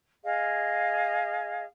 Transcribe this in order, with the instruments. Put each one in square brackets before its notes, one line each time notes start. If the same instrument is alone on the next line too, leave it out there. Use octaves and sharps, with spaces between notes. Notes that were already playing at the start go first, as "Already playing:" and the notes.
[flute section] G#4 D#5 F5